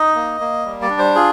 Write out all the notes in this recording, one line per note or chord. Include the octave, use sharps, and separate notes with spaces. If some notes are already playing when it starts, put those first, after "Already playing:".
Already playing: D#4 D#5
A#3
A#3
G3
D5
D4
C5
F4 G#4